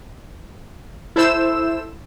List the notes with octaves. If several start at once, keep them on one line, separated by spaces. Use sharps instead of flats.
E4 A4 C5 E6 E7